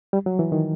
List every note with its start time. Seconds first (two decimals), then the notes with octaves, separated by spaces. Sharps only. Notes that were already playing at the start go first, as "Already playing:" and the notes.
0.13 G3
0.26 F#3
0.39 E3
0.52 D#3